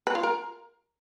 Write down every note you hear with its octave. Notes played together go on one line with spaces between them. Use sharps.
B4
F4
A#4